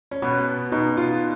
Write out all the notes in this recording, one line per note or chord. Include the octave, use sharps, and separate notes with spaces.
C#4
B2 B3
B2 D#4
F4